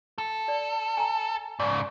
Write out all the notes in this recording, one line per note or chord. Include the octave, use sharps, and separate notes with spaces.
A4
D5
G#5 A#5
G#2 C#3 D5